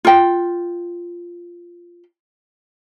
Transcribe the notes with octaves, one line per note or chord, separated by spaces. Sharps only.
F4 G5